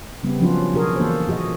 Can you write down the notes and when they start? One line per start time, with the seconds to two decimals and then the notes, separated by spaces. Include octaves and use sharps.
0.23 C#3 G3 B3 C4
0.40 F3 F#3 C#4 D4 F4 B4
0.74 B2 D4 F#4 G#4 A#4
0.96 E3 A#3 D4 A4 C5
1.27 A#2 F#4 G#4 D#5